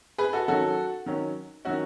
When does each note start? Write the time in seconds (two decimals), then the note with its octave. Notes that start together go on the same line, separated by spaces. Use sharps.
0.18 G#4 B4
0.33 F#4 A4
0.48 D#3 F#3 C#4 F#4 A4
1.06 D#3 F#3 C#4
1.65 D#3 F#3 C#4 F#4